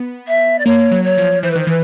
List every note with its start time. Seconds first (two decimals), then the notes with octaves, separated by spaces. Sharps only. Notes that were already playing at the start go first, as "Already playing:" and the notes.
Already playing: B3
0.27 E5
0.58 D5
0.65 A#3 C#5
0.91 F#3
1.04 C#5
1.18 F3
1.43 E3 C5
1.50 B4
1.55 D#3 C5
1.67 E3 B4